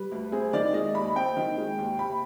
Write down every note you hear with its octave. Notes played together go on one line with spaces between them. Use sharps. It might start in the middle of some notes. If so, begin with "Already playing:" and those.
Already playing: G3 B4
D2
C4 G#4
D#3 D5
G#3 D#5
D#2 B5
C4 G5
D#3
G#3
D#2
C3 B5